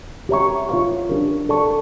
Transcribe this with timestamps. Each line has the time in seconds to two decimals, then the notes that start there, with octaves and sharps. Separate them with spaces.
0.29 G4 C#5 E5 A#5 C#6
0.69 F4 C#5 F5 C#6
1.09 D4 G4 A#4
1.49 A4 D5 A5 C#6